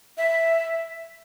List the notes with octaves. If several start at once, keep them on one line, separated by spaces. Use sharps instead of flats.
E5